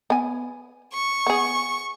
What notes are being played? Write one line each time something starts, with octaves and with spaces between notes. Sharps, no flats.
B3 G#5
C#6
B3 G#4